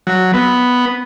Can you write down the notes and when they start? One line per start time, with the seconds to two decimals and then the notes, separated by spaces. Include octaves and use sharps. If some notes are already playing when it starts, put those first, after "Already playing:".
0.07 F#3
0.33 B3